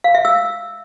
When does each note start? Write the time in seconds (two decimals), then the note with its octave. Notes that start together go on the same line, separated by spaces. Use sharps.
0.04 F5
0.15 E5
0.25 E6